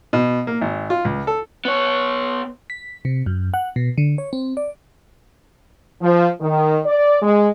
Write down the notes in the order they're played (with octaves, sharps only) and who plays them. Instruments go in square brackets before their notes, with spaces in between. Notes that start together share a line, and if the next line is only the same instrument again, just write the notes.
[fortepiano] B2
A#3
G#1
F4
C#2
A4
[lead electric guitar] B3 C#5
[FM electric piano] B6
C3
F#2
F#5
B2
D3
C#5
C4
D5
[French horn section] F3
D#3
D5
G#3